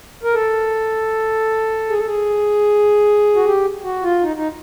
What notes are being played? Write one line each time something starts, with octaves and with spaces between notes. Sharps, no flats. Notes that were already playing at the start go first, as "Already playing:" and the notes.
A#4
A4
G#4
A4
G#4
F#4
G4
F#4
F4
D#4
D#4